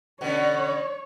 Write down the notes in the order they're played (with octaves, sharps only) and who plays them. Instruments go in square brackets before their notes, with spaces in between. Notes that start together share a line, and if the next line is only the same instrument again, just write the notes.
[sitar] B2 D3 C#4 [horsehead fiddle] C#5